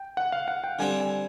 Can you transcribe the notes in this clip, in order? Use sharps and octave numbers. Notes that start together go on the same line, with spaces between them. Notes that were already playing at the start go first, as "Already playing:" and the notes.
Already playing: G5
F#5
F5
F#5
G5
D3 G3 C4 G#5
G#5